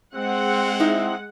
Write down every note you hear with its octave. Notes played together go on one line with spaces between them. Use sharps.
G#3 C4 F#5
D#4 E4